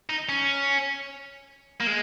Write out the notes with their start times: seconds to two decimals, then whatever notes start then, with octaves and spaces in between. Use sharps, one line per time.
0.10 D#4
0.29 C#4
1.81 A#3
1.87 G#3